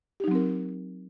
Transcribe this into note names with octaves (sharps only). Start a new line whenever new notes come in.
F#3 C4 D#4 G4 A#4